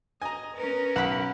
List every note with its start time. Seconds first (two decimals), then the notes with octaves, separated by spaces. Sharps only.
0.22 D#5 G#5 A#5
0.56 C#4 A#4 B4
0.96 B1 F#5 B5